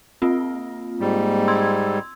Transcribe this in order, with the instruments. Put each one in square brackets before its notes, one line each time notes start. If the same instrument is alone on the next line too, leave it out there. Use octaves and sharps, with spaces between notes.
[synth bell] A#3 C4 F4
[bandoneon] G#2 G3
[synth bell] C6 E6 G#6